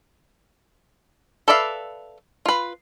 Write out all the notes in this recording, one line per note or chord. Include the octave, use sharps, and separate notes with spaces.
A4 B4 D5 E5 F5
F4 B4